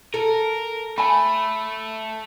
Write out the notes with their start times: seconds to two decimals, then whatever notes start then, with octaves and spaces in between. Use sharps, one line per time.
0.14 A4 A#4
0.98 A3 G#5 B5